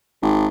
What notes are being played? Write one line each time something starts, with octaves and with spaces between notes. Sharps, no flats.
G#1